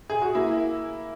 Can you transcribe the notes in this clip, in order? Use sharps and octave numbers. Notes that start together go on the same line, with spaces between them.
G#4
F#4
A#3 E4